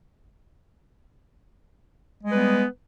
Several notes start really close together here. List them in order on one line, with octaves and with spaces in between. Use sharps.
G#3 G3 B4 B3